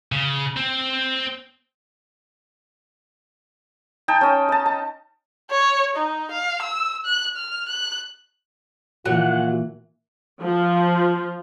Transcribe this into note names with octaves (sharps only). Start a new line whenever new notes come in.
C#3
C4
D#4 G5 A5
C#4 D#5
D#5 A5
A5
C#5
D#4
F5
E6
F#6
F6
F#6
A#2 E3 F#3 F4 F#5
F3